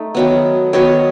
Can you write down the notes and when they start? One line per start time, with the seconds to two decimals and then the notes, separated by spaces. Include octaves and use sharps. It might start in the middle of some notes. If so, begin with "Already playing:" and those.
Already playing: A3 D#4
0.15 D#3 F#3 B3
0.73 D#3 F#3 B3 C#5